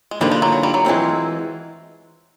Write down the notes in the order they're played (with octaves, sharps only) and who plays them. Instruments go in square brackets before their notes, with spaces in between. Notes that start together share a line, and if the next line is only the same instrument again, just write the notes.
[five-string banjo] G#3
[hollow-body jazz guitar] G2 D3 F3 A#3 D#4 [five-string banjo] G3
[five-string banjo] G3
F#3
F#3
G3
F#3
[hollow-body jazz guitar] E3 G#3 C4 F4